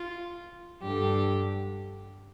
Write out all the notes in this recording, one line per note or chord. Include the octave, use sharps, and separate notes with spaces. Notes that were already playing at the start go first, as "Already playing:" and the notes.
Already playing: F4
G2 D3 G4